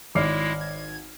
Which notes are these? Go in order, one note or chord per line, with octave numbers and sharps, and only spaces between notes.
G#1 G#3 E4 C#5 D5 D6 F6 C7
G#6